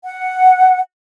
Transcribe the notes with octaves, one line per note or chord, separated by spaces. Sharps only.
F#5